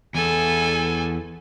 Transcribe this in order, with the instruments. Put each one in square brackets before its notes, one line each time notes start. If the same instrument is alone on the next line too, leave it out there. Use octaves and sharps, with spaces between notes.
[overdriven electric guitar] E2 [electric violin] A4 G#5